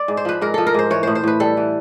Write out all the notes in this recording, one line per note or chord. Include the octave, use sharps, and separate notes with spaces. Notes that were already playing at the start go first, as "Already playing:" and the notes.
Already playing: D5
G#2
C5
F3 B4
G#2 A#4
F3 A4
A#4
G#2 C5
E3 C#5
A2 C5
C5
A2 B4
G3 A4
E3